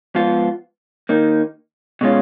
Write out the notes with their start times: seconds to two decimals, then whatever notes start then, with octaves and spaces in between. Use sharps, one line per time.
0.15 G#2 F3 B3 F4
1.09 D#3 A#3 D#4
2.01 B2 G#3 C#4 F4